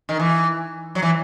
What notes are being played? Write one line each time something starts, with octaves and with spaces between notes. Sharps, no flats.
D#3
E3
F#3
E3